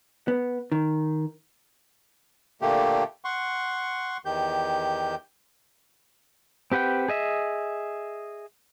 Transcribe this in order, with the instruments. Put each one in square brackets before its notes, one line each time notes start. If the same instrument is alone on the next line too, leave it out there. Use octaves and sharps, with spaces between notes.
[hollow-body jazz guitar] B3
D#3
[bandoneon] A#2 D3 A3 A#3 G4
F#5 C6 C#6
E2 D#3 G4 G6
[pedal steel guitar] C4 G4 B4 F#5 G5
G#4 D#5 E5